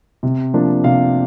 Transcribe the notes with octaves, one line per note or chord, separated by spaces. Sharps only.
C3
F3 A#3 D4
C3 F5